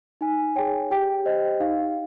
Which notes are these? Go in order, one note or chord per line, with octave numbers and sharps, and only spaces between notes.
D#4 G#5
G#4 C#5 G5
G4 G5
C5 D#5
D#4 F5